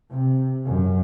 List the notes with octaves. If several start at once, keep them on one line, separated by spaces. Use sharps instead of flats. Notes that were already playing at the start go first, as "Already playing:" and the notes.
C3
F#2